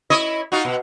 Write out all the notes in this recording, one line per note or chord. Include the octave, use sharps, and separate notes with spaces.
E4 C#5 D#5
D#4 F4 F#4
B2